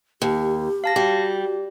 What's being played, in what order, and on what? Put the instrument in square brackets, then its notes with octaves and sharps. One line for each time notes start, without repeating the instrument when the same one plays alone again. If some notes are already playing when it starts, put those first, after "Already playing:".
[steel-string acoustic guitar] D#2 [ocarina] G4
[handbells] F5 A5 A#6
[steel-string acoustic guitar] G3 [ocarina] F#4 [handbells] G4